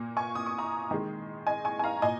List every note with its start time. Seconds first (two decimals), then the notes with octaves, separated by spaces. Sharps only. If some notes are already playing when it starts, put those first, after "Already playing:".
Already playing: A#2 A#3
0.17 G#5 C#6
0.35 D#6
0.46 C#6
0.58 A#5 D#6
0.91 D#3 G#3
1.47 D#5 G#5
1.65 G#5 C#6
1.79 G#5
1.84 F5 A#5
2.02 A#2 D#5 G#5